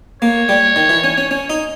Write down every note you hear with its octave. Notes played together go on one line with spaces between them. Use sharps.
A#3 C#5
G3
D#3
E3
C#4
C#4
C#4
D#4